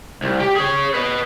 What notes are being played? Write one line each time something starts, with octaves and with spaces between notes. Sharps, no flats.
C2
G4 G5
G#4 C#5
B4 D#5